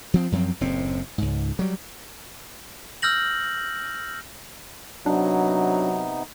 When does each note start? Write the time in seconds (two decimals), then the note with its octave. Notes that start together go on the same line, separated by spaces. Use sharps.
0.14 F3 C4
0.32 F#2 F3 F#3 C4
0.61 F#1 A2 C4
1.18 C#2 G#2
1.59 F#3 G3
3.02 E6 F6 G6 A#6 F#7
5.06 C3 F#3 B3 D4 D#4